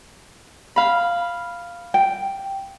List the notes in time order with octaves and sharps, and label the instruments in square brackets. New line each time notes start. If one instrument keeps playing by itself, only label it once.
[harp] F5 B5
[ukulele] G5